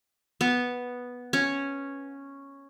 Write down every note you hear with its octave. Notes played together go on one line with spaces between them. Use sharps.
B3
C#4